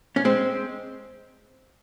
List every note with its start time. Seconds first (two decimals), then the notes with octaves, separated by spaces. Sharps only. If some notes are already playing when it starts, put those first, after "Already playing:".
0.16 C#4
0.25 G#3 C4